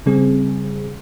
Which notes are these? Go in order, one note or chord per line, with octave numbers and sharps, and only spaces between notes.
C#3 G3 C4 G#4